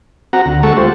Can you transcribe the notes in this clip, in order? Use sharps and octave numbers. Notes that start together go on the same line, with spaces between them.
C4 F#4 F#5 A#5
D2
G#3 A3 A4 F#5 A5 C#6
F4 G4 C5